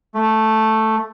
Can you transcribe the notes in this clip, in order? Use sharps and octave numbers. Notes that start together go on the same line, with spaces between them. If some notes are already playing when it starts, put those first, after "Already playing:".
A3